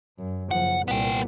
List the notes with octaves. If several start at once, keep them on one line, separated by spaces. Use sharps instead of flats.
F#2
F#1 F3 F#5
C2 A#2 B3 G5